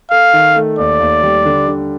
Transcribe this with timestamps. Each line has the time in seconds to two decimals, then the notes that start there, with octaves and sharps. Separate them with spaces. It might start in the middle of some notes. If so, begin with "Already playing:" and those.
0.11 A4 F5
0.33 D#3
0.56 A3
0.78 D#2 D5
1.00 D#2
1.23 G3
1.45 D3
1.67 D3